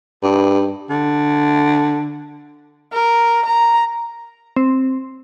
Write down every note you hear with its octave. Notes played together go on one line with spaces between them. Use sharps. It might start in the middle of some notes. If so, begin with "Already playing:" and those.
G2
D3
A#4
A#5
C4